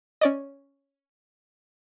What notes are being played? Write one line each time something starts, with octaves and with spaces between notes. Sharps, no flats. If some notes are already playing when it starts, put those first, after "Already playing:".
C#4 D5 D#5